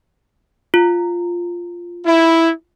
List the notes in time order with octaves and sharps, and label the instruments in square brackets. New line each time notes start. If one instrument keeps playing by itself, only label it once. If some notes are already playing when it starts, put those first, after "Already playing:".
[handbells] F4
[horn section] E4